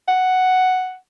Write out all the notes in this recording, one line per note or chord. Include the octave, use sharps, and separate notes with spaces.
F#5